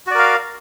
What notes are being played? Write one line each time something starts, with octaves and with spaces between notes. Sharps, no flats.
F#4 A#4 D5 F5